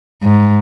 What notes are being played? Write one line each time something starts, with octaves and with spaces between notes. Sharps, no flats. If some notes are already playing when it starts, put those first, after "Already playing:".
G#2